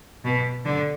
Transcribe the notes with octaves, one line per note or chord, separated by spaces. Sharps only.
B2
D3